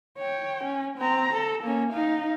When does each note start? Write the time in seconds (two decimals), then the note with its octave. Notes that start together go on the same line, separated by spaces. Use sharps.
0.18 C#5 G5
0.64 C#4
0.98 C4 A#5
1.33 A4
1.63 A#3 C#4
1.93 D#4 F5